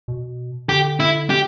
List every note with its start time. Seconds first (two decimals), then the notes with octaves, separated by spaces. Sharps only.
0.08 B2
0.69 D3 G4
1.00 E4
1.30 G4